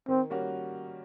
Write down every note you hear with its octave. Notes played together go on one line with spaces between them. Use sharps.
D#3 C4
G3 A#3 C#4 F#4